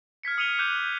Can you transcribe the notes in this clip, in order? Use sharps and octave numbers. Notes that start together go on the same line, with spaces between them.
F6 G#6 B6 C#7
D#6 C#7 D#7 F7 G7
D6 F#6 G6 D#7 E7